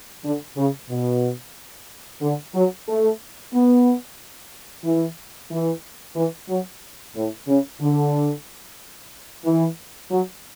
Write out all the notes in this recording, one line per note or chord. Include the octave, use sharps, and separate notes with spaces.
D3
C#3
B2
D3
F#3
A3
B3
E3
E3
E3
F#3
A2
C#3
D3
E3
F#3